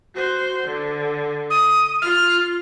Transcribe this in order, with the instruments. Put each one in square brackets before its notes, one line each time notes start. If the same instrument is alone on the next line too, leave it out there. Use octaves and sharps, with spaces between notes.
[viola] F#4 C5
D3
[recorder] D#6
[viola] F4 [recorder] F6